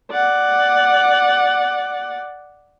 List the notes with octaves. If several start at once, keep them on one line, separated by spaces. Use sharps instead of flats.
D5 F#5